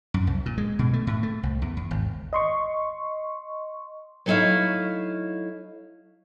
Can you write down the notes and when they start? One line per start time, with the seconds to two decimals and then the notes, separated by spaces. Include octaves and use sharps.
0.14 F#2
0.27 C2
0.46 A#2
0.58 G#3
0.79 B2
0.93 A3
1.07 A2
1.23 A3
1.43 C2
1.62 E2
1.77 E2
1.91 G#1
2.33 D#5 C6 C#6
4.26 F#3 A3 D#4 E4 C#5 F5